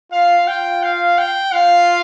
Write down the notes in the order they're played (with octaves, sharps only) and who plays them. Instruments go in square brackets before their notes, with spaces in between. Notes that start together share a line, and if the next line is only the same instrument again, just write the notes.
[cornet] F4 [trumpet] F5
[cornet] F4 [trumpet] G5
[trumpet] F5
G5
[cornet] F4 [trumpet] F5